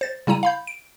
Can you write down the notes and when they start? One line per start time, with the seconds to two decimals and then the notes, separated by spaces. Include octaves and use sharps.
0.01 C5 A6
0.27 C#3 G3 E4 A#5 D#7
0.43 F5 B5 G6
0.67 D7